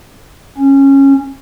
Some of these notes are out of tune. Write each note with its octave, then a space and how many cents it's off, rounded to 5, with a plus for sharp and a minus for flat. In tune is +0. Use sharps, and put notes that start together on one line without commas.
C#4 -15